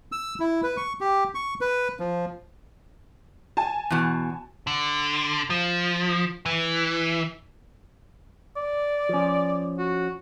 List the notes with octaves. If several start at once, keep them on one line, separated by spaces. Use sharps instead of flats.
E6
E4
B4
C#6
G4
C#6
B4
F3
G#5 A5
E2 B2
D3
F3
E3
D5
F3 C#4
F#4